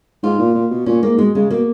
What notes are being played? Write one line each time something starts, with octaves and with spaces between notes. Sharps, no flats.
G#2 F4
A#2
A#2
B2
A#2 C#4
G#2 A#3
B2 G#3
C#3 G#3
B2 A#3